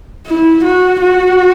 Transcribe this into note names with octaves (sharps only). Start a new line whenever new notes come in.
E4
F#4
F#4